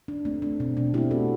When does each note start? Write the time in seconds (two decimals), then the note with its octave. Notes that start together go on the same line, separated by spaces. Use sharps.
0.08 D4
0.25 A3 C4 D4
0.42 D4
0.60 B2 C4
0.77 D4
0.94 A3 C4 E4 G4
1.11 F#4 A4